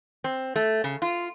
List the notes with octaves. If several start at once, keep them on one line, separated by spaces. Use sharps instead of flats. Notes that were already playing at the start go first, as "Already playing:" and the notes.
C4
A3
C#3
F4